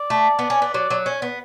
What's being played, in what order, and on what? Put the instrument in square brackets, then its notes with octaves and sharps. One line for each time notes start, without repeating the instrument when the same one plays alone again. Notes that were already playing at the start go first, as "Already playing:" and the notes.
Already playing: [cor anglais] D5
[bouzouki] A3
B3
C#4
B3
[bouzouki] F#3 [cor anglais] D5
[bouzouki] F#3
C#4
B3